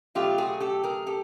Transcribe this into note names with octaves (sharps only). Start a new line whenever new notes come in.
B2 F#3 A3 F4 G4
F#4 G#4
G4 A4
G#4 A#4
G4 A4